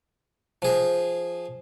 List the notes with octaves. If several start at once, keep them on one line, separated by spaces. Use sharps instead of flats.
F3 G#4